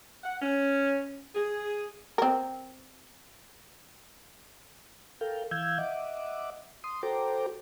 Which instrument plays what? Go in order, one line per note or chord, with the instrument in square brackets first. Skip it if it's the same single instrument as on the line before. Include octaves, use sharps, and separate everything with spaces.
[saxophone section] F#5
C#4
G#4
[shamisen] C4 A#4
[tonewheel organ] A4 A#4 F5 G5
E3 F5 E6 G6 G#6
D#5 E5 F#5 D6
C6 D#6
F#4 A4 C5 G5 A#5 D6